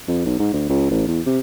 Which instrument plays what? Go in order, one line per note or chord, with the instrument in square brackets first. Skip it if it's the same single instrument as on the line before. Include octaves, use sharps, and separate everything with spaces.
[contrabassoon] F2
B1
G#2
D2
C#2
A1
E2
C3